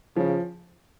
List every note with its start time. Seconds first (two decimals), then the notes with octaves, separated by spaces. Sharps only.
0.16 C#3 F3